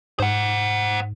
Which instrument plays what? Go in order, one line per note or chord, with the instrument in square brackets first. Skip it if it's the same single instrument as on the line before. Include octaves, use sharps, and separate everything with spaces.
[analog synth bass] G#2 [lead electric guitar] C5 F#5